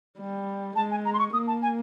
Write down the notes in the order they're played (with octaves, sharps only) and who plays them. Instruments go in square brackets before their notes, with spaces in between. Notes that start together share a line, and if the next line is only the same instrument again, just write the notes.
[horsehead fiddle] G3
[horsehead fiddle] G#3 [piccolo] A5
[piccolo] G#5
A#5
C6
C#6
[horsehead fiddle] A#3 [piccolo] D#6
[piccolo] A5
G#5